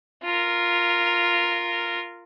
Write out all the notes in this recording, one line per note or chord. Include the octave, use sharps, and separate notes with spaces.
F4 A#4